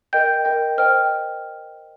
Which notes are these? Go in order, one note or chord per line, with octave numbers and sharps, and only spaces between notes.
A#4 D#5 G5 G6
A#4 D#5 G5
C5 D#5 G5 F6
G5